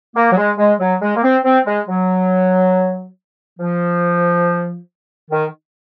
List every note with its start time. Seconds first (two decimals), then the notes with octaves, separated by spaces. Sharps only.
0.15 A#3
0.32 F#3
0.37 G#3
0.58 G#3
0.79 F#3
1.01 G#3
1.16 A#3
1.23 C4
1.44 C4
1.65 G#3
1.87 F#3
3.59 F3
5.31 D#3